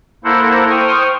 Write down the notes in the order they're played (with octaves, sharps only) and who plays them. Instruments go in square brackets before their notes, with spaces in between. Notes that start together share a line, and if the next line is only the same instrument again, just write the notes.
[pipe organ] A#3 E4 A4 A#4 C5 F#5
C5 G5 C#6 D#6 F6